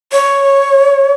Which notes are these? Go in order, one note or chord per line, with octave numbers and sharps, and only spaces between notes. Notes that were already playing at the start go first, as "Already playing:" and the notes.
C#5